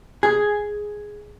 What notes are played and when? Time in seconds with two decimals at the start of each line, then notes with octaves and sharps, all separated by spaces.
0.23 G#4